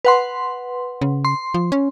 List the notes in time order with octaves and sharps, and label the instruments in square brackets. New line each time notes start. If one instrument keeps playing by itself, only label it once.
[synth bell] B4 F#5 C6
[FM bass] C#3
[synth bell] C6
[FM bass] F3
C#4